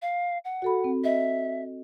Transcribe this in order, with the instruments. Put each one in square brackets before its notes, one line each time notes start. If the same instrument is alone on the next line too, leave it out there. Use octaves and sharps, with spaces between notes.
[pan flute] F5
F#5
[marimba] F#4 A4 B5
C4
[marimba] D#5 [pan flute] E5